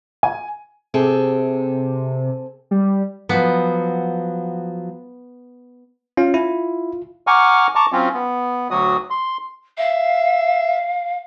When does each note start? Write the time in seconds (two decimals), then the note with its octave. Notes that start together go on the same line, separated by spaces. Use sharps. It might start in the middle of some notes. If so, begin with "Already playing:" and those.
0.23 G#5
0.94 C3 C4 G#4 A4
2.71 G3
3.29 F3 F#3 B3
6.17 C#4 F4
6.34 E4
7.27 F#5 G#5 A#5 C#6 D6 F6
7.75 A5 A#5 C#6 D6
7.92 F#3 C4 C#4 F4
8.14 B3
8.71 D2 F#3 F#4 D#6
9.10 C6
9.78 E5 F5